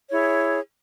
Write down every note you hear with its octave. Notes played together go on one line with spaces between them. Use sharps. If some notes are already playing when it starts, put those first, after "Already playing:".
E4 G#4 C#5